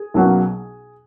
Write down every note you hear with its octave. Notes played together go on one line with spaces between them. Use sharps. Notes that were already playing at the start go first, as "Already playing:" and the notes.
Already playing: G#4
B1 B2 F#3 A#3 C#4